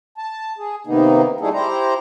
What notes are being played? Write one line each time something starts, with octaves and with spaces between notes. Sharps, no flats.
A5
G#4
C3 D#3 A#3 B3 D#4
G3 A3 D#4 E4 G#4 A4
E4 G4 C5 A#5